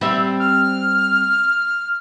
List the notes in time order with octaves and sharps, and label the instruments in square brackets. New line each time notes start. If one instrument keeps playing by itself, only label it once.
[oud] G3 C4 E5
[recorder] F6